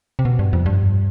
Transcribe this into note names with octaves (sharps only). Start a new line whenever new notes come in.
C3
B2
G2
F2
G2